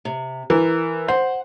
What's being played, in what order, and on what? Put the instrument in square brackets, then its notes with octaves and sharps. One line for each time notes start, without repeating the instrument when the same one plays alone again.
[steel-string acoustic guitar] C3
[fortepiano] E3 [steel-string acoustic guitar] A#4
[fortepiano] C5 [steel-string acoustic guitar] F#5